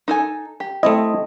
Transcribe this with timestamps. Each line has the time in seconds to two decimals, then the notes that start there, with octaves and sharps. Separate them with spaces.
0.08 D#4 A4 G#5
0.60 G4
0.83 A3 C4 E4 D#5